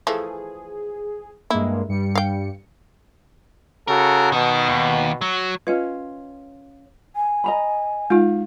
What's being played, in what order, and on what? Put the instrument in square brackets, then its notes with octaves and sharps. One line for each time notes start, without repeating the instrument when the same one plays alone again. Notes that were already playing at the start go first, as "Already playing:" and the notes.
[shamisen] E3 F3 A3 [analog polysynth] G#4
[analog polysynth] G2 G#3 A#3 [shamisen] E4
[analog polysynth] G2 G3 C#7
[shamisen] F5 G5
[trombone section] C#3 F#4 A4 [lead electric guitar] A#4
[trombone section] B2 [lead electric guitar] D#3
[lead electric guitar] D#2
F#3
[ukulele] C#4 F4 [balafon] B4 D#5
[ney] G#5
[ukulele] D#5 A#5 B5
[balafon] G#3 D#4 [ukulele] F4